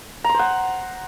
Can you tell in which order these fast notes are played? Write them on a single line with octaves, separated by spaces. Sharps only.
A#5 C6 C5 F#5